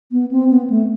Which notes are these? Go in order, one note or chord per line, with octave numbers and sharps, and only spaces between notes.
B3
C4
B3
A3